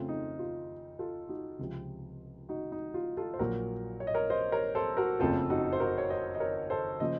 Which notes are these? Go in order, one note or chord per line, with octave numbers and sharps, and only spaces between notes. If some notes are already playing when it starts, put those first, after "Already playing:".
Already playing: F2 C#3 A3 C4 F4
D#4
F4
F4 A4
D#4 F#4
C#2 C3 F3 C4
D#4 F#4
D#4
F4
F4 A4
C5
A#1 A#2 F#3 F#4 A#4
C#5
D#5
A#4 C#5
C5 D#5
A#4 C#5
A4 C5
F#4 A#4
F#1 F2 C#3 A3 C4 F4 A4
D#4 F#4
C5
F#4 A#4
C#5
C5 D#5
D#5
A#4 C#5
A4 C5
C#3 F3 A#3 C5 D#5